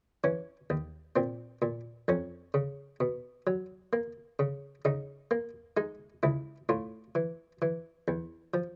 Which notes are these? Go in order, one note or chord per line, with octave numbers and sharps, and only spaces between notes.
E3 C#4
D#2
A#2 C4
A#2
F2 C#4
C#3
B2
F#3
A#3
C#3
C#3 D#4
A#3
G#3 D#4
C#2 E4
A2 F4
E3
E3
E2
F3